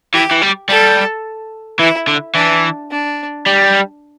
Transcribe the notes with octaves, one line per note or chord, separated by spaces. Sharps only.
E3 G4
E3
G3
G3 A4
E3 E4
D3
E3 D4
D4
G3